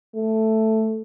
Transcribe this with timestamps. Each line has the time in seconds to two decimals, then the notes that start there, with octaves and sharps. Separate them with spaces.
0.16 A3